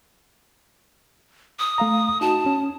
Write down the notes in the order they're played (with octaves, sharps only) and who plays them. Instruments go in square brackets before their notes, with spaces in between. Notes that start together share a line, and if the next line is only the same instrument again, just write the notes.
[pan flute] D#6
[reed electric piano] A3 F5 A#5
[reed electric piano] D#4 F#4 [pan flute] A5
[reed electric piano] C#4